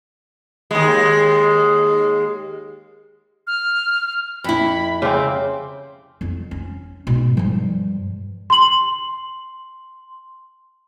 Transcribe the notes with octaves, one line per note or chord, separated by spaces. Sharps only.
D#2 G#3
F6
F2 E4 B5
C#3 C4 D6
F2
C#4
G#2 B2
G2 F3
C6 F#7